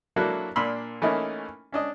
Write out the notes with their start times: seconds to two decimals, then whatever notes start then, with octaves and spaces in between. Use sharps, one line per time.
0.16 F#3 A#3 D4 E4 F#4 A4
0.56 A#2 A#3 D4 B5 C6 E6
1.02 E3 A3 A#3 C#4 D#4 E4
1.72 C#4 D4 D#5